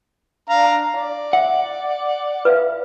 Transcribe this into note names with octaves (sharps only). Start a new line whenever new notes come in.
D4 F5 A#5
D5 F5
E5 F#5
B4 E5 F5